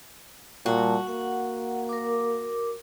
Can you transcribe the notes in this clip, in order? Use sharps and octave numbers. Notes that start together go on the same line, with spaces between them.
A#2 G3 F#4 A5
A#3 F#5
A#4 D6